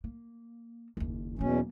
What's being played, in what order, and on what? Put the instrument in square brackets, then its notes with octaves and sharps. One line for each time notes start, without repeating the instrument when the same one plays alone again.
[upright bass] A#3
F#1 D#2
[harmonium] E2 B2 C#4 [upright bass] F#3 A#3